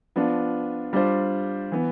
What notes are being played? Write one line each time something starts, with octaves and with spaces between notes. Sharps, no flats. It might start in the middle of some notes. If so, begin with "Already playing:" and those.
F3 B3 D4 F4
G3 D4 F4 C5
E3 B3